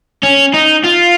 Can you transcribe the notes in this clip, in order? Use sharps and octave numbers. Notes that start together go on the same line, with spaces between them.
C#4
D#4
F4